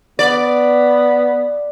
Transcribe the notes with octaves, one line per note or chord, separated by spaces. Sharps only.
B3 D5